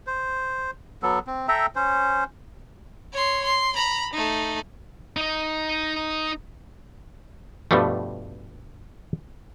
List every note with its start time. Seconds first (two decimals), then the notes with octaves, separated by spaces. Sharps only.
0.07 C5
1.03 F#3 B3 A4
1.27 C4
1.48 A4 E5 G5 A#5
1.75 C#4 C5
3.12 C#5 C6
3.44 C6
3.75 A#5 B5
4.13 A3 D#4
5.17 D#4 D#5
7.71 G2 B2 F3 G3 A3